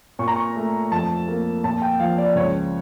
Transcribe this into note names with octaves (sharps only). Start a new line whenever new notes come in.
A#2 C#6
A#5
C#6
A3
F2 A5
A#3
A#2 A5
G5
F3 F5
D5
C#2 C#5